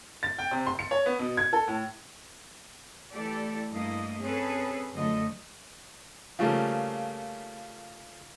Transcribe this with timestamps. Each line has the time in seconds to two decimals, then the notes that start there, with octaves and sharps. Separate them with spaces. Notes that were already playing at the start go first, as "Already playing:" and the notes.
0.23 A6
0.39 G5
0.51 C3
0.67 C6
0.79 C#7
0.91 C#5
1.06 B3
1.19 B2
1.37 G#6
1.53 A4
1.68 A2
3.14 E3 A3 E4 G4 A4 D5
3.72 G2 A3 A#3 E4 D#5
4.21 C4 C#4 G#4 A4 B4
4.93 F#2 D3 F3 A3 D#5
6.39 C#3 F3 G3 A3 A#3